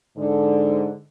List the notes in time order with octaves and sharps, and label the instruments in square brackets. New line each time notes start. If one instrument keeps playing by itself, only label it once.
[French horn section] G#2 D3